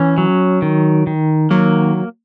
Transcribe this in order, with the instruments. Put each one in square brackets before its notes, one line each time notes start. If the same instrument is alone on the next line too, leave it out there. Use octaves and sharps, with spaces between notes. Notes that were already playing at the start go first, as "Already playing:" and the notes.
Already playing: [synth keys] E3 [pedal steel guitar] C#4
[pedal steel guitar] F#3
D#3
D#3
[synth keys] F#3 [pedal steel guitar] A#3